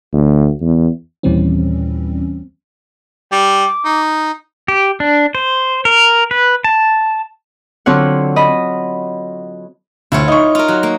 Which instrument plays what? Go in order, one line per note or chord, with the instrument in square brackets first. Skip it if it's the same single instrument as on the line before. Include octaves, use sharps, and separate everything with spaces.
[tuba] D2
E2
[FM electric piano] D#2 A#2 E3 G3 C4 C#4
[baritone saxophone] G3 [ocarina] D6
[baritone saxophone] D#4
[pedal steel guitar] G4
D4
C5
A#4
B4
A5
[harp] D3 F#3 C4 F4 C#5 F#5
D#5 B5
[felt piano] D2 [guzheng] E4 F4 C#5
[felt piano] D#4 C#6
[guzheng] F4 A#4
F#3
A#3